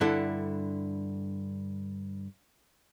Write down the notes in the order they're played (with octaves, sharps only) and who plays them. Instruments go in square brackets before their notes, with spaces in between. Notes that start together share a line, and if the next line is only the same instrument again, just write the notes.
[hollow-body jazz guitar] G2 D3 E4 A4